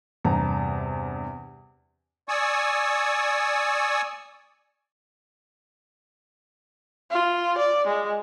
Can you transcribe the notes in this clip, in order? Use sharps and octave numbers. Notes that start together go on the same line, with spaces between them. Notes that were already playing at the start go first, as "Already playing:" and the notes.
E2 G2 C3 A5 A#5
D5 G#5 C#6 D#6 E6
F4
D5
G#3